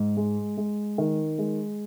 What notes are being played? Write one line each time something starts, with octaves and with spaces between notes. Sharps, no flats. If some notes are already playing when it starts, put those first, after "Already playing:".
Already playing: G#2
G#3
G#3
D#3
G#3